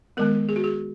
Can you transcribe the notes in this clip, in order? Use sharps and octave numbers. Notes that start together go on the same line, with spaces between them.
D#3 G#3 B3 A#4
G#4
F#4
G#4